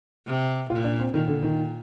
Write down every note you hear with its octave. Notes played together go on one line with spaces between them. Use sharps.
C3
A#2 F4
D4
C4
A#2 D#3
D3
D#3